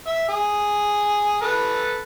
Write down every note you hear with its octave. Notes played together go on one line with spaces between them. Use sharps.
E5
G#4
A4 B4